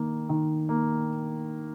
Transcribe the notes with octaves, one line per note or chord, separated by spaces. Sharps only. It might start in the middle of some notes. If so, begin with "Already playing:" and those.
Already playing: D#3 A#3
D#3
A#3